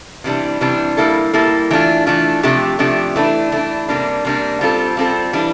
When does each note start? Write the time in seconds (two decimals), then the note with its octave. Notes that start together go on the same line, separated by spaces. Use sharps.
0.24 C3 E3 G3 D4
0.61 C3 E3 G3 D4
0.97 G3 A#3 E4 A4
1.33 G3 A#3 E4 A4
1.71 E3 A3 D4 F4
2.06 E3 A3 D4 F4
2.43 C3 F3 A3 D4 G4
2.79 C3 F3 A3 D4 G4
3.16 E3 A3 D4
3.52 E3 A3 D4
3.88 C3 G3 A#3 D4
4.25 C3 G3 A#3 D4
4.61 G3 C4 F4 A4
4.97 G3 C4 F4 A4
5.33 E3 G3 D4